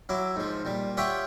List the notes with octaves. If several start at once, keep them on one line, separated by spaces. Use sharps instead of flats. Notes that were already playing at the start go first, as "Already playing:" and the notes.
F#3 E4 D6
G#2 F3
A#2 G3
F4 G4 C#5 E5 F#5 G5